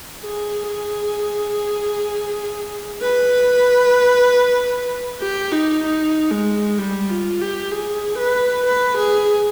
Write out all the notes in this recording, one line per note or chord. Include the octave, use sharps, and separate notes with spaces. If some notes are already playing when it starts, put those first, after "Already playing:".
G#4
G#4
B4
G4
D#4
D#4
G#3
G3
F4
G4
G#4
B4
B4
G#4